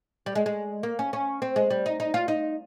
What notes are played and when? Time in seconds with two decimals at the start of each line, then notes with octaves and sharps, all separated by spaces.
0.26 G3
0.35 G#3
0.46 G#3
0.83 A#3
0.99 C#4
1.13 C#4
1.42 C4
1.56 G#3
1.70 G3
1.86 D#4
2.00 D#4
2.14 F4
2.28 D#4